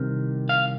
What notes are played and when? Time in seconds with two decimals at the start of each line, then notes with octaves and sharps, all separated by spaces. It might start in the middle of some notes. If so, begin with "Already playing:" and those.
Already playing: C2 C3 D#3
0.49 F5